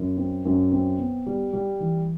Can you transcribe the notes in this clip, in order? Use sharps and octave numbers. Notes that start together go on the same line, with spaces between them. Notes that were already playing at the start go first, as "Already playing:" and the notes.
Already playing: F#2
C4
F#2
C4
B3
G3
G3
E3